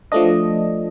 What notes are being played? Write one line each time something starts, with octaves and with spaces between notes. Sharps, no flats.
F3 A3 D4 D#5